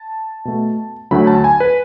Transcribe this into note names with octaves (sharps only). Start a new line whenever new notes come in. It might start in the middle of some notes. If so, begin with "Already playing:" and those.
Already playing: A5
B2 A3
D2 D3 F#3 A3 B5
A5
G#5
B4